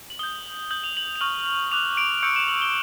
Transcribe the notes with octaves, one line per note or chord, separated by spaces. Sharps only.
F#7
D#6 G6 G7
D#6 G6 F#7
F7
F#7
F7
C#6 F6 F#7
D6 F#6 F7
D7
C#6 E6 G6 C#7
E7
F#7
G7